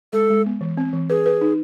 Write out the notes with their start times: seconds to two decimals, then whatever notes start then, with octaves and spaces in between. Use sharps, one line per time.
0.13 G#3 A4
0.30 G#3
0.46 B3
0.61 E3
0.77 C4
0.93 E3
1.10 G#4 B4
1.26 B4
1.41 D#4